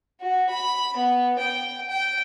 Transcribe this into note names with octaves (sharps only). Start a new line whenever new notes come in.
F#4
B5
B3
G5
G5